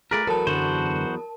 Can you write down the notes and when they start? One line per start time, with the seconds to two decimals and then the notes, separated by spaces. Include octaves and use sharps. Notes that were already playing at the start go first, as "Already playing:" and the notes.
0.11 A3 F4 G#4 A#4 B4 D5
0.27 E2 F#3 B3 A4 A#4 A5
0.47 F#2 D3 F#4 C5